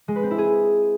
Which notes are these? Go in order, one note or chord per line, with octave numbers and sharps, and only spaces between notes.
G#3
B4
C4
E4
G#4